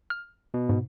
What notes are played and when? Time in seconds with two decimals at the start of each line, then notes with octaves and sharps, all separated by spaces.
0.10 F6
0.54 B2
0.69 G#2